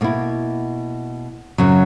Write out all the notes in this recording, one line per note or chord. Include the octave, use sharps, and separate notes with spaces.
B2 A#3 E4
F#2 C#3 F#3